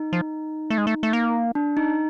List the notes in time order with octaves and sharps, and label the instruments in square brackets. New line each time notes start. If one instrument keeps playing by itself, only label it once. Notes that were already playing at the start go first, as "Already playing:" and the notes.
Already playing: [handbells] D#4
[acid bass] F3
A3
G#3
A3
A3
A#3
[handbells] D4
D#4